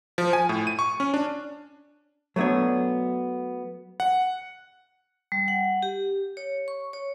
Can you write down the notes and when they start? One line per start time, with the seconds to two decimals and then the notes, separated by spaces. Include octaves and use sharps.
0.18 F3
0.33 G#5
0.49 A2
0.67 D#7
0.79 C#6
1.00 C#4
1.14 D4
2.36 F#3 A3 B3 D4 C#5
4.00 F#5
5.32 G3
5.48 F#5
5.83 G4
6.37 C#5
6.68 C#6
6.93 C#5